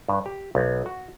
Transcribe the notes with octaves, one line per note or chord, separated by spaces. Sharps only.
G2
G4
B1
F#4